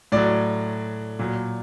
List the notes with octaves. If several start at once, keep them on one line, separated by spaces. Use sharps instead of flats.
A2 F#3 D5
A#2 F#3